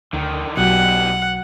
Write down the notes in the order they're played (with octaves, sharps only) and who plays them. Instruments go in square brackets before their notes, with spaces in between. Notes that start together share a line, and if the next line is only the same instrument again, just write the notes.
[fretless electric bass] D2 [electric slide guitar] D3 D#3
[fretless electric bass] B1 [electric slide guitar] B2 D4 G4 [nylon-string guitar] F#3 [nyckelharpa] F#5